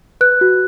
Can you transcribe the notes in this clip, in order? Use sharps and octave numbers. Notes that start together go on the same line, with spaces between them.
B4 F#6
F#4